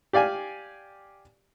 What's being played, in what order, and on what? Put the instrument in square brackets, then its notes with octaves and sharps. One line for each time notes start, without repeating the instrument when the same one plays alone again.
[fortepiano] G4 D5 F5 G#5